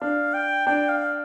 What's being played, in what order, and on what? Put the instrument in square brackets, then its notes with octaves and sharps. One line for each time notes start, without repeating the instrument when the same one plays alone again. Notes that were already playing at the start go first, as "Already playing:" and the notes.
[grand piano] D4 [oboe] F5
[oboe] G5
[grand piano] D4 [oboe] G5
[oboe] F5